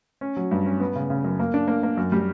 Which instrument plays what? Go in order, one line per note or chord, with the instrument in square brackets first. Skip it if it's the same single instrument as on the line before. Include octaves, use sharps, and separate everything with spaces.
[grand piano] C#4
F#3
G2
C#4
B3
C#3
C#3
F#2
A#3
D4
A#3
A#3
F#2
G3